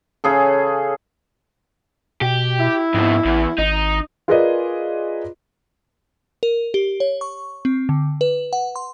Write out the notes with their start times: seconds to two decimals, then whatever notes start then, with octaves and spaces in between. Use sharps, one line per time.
0.24 C#3 G#4 A4
2.21 B2 G4
2.59 E4
2.94 F2 G#2 B2
3.25 A1 E2
3.58 G#1 D#4
4.28 F4 G#4 A#4 B4 D5 D#5
6.43 A#4
6.74 G4
7.00 C#5
7.21 C#6
7.65 C4
7.89 D3
8.21 B4
8.53 F#5
8.76 C6